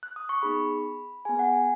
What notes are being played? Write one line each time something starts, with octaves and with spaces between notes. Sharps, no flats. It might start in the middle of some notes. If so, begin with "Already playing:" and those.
F#6
D#6
C#6
B3 D#4 G#4 B5
B3 G#4 G#5
F#5
G#5